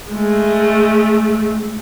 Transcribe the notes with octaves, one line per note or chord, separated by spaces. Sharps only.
G#3 A3